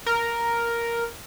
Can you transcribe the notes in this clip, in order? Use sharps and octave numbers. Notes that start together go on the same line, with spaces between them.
A#4